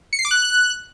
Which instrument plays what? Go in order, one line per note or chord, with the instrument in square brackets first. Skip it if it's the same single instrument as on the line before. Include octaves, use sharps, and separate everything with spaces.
[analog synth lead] C#7
C7
D6
F#6